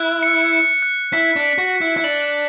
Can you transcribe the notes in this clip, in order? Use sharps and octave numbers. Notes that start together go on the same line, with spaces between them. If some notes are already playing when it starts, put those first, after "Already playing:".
Already playing: E4 F#6
C#7
C#7
F#6
E4 B6
D4
B6
F#4
B6
E4
E4
D4 F#7